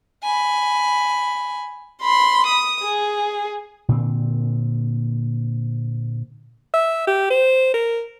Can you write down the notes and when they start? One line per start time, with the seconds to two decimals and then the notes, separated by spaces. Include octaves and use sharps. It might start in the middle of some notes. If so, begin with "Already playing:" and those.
0.23 G#5 B5
2.02 B5 C6
2.47 D#6
2.84 G#4
3.89 A#2 D3 C4
6.73 E5
7.07 G4
7.30 C5
7.74 A#4